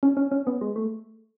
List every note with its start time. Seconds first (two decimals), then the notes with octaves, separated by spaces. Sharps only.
0.03 C#4
0.17 C#4
0.31 C#4
0.47 B3
0.61 G#3
0.76 A3